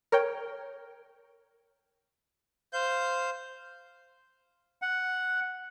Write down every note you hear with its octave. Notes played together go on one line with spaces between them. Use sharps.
A#4 C#5 G5
C5 F5 G6
F#5